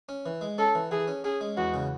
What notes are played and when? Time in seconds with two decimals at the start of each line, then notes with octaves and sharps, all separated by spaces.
0.09 C#4
0.26 E3
0.41 G#3
0.58 C#4 A4
0.75 E3
0.91 E3 G#4
1.08 C#4
1.24 C#4 G#4
1.41 G#3
1.57 E2 F#4
1.74 C#3